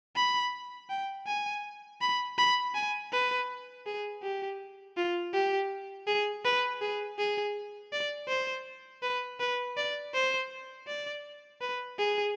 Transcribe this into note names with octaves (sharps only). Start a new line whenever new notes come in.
B5
G5
G#5
B5
B5
G#5
B4
G#4
G4
F4
G4
G#4
B4
G#4
G#4
D5
C5
B4
B4
D5
C5
D5
B4
G#4